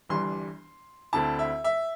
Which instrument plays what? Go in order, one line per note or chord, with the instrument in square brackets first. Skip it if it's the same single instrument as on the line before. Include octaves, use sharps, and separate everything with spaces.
[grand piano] G1 G2 E3 G3 D4 C6
D2 D3 C4 E4 A5
E5
E5